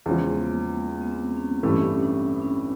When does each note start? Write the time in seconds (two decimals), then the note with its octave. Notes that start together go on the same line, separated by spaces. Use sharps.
0.06 E2 C#3 F3 G#3
0.34 B3
0.45 A#3
1.02 B3
1.11 C4
1.37 C#4
1.63 A1 G2 E3 A3 C#4
1.73 C4
1.82 C#4
2.02 D4
2.42 C#4